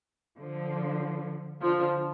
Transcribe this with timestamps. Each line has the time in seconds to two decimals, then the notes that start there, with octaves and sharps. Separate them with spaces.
0.39 D3 F3
1.61 D3 F3